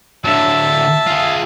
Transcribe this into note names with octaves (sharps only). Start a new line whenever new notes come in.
D3 F#3 E5 A5
F4 G#4